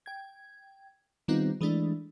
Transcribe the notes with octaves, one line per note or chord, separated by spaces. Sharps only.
G5 G#6
D#3 G3 B3 C4 D#4 F4
E3 G#3 A3 D4 E4